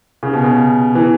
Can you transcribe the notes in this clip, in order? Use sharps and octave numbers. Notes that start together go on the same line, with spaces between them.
C#3
B2
C#3
E3